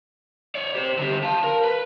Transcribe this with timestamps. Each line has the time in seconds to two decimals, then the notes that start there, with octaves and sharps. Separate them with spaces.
0.55 C#5 D5
0.75 G4 C5
0.98 D3 G4
1.23 F5 A5
1.44 A#4
1.64 B4